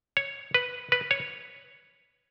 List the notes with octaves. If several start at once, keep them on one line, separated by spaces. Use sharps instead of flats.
C#5
B4
B4
C#5